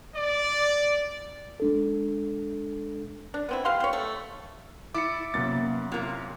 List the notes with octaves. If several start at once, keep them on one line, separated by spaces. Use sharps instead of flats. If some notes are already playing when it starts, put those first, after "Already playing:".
D5
G#3 D4 A4
D4
B3 C4 E4
G4 F5 C6
G4 C#5
A3
E4 D6 A6 C#7
F#2 C3 A#3 B3 A6
C3 A#3 E4 F4